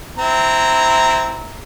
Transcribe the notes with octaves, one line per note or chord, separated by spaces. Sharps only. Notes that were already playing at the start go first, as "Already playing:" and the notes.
C4 E4 A#5